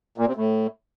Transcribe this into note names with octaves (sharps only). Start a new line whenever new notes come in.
A#2
C3
A2